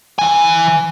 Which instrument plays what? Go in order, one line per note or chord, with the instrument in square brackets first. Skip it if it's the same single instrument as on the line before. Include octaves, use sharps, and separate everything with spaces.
[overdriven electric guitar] E3 G#5